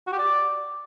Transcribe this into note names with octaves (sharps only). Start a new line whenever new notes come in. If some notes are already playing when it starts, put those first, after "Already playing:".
F#4
G4
D5